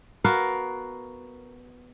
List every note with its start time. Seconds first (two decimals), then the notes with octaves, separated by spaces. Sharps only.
0.24 B3 F#4 A#4 F5